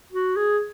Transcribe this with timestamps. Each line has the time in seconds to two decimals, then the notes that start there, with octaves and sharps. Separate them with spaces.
0.13 F#4
0.37 G#4